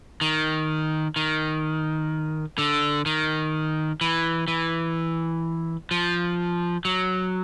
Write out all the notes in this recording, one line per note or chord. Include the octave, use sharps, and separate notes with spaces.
D#3
D#3
D3
D#3
E3
E3
F3
F#3